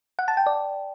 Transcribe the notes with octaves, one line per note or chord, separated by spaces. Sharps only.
F#5
A5
G5
D5